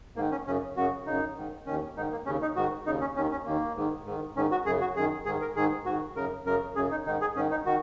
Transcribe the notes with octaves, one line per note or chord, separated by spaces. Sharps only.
G#2 D#3 A#3
C#4
F#2 C#3 C#4
F#2 C#3 F#4
F#2 C#3 D#4
G#2 D#3
D#2 D#3 C#4
G#2 D#3 D#4
A#3
D#2 C#3 C#4
D#4
G#2 D#3 F#4
D#2 C#3 D#4
C#4
D#2 D#3 C#4
C#4
D#2 D#3 A#3
G#2 D#3
G#2 D#3
G#2 D#3 C#4
F#4
F#2 C#3 G#4
F#4
F#2 D#3 G#4
G#2 D#3 G#4
A#4
G#2 D#3 G#4
G#2 D#3 F#4
F#2 C#3 A#4
F#2 C#3 A#4
F#2 C#3 G#4
D#4
G#2 D#3 D#4
G#4
G#2 D#3 C#4
D#4
D#3 F#4